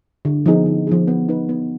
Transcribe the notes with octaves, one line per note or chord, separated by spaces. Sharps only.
D3
F3 B3 D#4 G#4
D3
F3 B3 D#4 G#4
B3
D#4 B4
B3